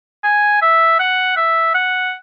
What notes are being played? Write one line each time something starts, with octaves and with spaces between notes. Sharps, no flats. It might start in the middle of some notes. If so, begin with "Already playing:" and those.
G#5
E5
F#5
E5
F#5